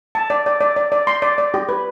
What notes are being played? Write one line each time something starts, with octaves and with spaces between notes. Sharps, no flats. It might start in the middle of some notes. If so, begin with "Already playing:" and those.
A5
D5
D5
D5
D5
D5
C6
D5
D5
G4
B4